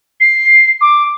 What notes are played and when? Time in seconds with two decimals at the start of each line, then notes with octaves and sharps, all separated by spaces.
0.20 C7
0.81 D6